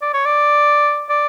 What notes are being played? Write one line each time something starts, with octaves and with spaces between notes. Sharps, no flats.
D5
C#5
D5
D5